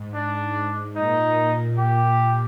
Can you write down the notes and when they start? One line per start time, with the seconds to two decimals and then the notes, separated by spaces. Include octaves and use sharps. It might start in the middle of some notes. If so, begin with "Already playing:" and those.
Already playing: G#2
0.14 D4
0.96 A#2 D#4
1.78 G4